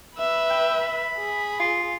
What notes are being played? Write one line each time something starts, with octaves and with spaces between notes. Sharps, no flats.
B4 E5
G5
B5
G#4
F4